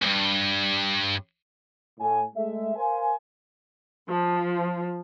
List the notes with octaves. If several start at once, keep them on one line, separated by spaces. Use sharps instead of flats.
C#2 G2
A2 G#5
G#3 A3 E5
A#4 C5 F5 G#5
F3